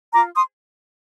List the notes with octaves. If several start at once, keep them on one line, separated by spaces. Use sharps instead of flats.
F4 A#5 D6
C6 D#6